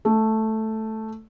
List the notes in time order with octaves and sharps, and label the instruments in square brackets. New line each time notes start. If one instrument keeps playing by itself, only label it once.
[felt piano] A3